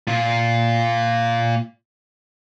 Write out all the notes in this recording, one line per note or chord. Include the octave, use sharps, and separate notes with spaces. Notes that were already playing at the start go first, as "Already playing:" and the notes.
A#2 F4